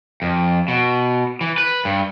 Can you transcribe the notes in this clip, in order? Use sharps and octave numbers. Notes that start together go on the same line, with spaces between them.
F2
B2
E3
B4
G2